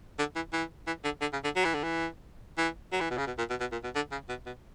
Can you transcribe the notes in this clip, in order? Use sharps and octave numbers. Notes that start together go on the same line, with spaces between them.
D3
E3
E3
E3
D3
D3
C#3
D3
F#3
E3
D3
E3
E3
F#3
E3
B2
C#3
B2
A#2
B2
B2
A#2
B2
D3
C#3
B2
B2